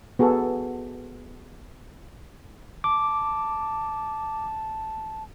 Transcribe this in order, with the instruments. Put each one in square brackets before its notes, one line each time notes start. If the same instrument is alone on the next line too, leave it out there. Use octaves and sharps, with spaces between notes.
[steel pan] B3 F#4 G#4 A4
[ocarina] A5 [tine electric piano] D6